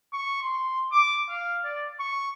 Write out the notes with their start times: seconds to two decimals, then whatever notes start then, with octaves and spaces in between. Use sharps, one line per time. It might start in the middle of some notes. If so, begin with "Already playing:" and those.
0.13 C#6
0.42 C6
0.92 D6
1.29 F5
1.64 D5
2.00 C#6